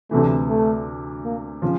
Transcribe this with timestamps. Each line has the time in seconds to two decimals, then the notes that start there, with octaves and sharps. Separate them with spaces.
0.11 D2 C3 E3 A3
0.49 A3
1.25 A#3
1.62 C#3 F3